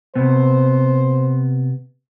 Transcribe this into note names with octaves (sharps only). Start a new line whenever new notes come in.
C3 B3 C5